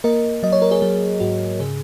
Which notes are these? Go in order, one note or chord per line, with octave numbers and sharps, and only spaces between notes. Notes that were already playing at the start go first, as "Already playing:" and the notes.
A#3 A#4 D#5
F#3 D#5
C#5
A#4
G#4 C#5
F#3 G#4
G#2 F#4
C#3 G#4